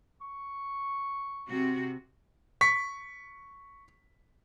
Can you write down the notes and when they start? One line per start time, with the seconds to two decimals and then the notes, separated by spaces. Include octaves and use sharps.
0.21 C#6
1.49 C3 C4 F#4
2.61 C#6 B6